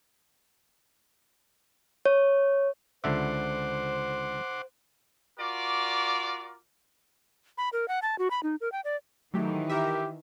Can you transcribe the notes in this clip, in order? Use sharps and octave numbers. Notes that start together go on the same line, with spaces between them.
C#5
C#2 D3 C5 E5 F#5 C6 D6
F4 F#4 A#4 D5 D6
B5
A#4
F#5
A5
F#4
B5
D#4
A#4
G5
D5
D#3 E3 F#3 A3 G4
G4 A#4 E5